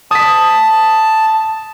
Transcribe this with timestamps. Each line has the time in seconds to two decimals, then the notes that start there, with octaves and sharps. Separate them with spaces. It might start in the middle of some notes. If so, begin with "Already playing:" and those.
0.11 A5 D#6 B6